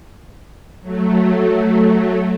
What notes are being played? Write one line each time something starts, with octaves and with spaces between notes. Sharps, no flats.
F#3 A3